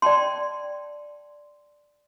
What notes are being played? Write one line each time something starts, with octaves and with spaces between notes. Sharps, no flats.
D5 G5 A5 C6